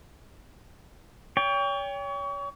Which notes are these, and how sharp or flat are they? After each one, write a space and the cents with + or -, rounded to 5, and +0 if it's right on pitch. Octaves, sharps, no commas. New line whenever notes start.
C#5 +35 G5 +25